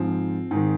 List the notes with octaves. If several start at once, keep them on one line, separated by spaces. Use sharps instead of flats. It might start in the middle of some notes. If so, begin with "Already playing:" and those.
Already playing: G#2 F3 C4
G#2 D#3